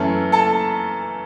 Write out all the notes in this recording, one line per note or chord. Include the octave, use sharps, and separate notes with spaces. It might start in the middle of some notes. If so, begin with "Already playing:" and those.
Already playing: F#2 E3 A3 C#4 A4
A4 A5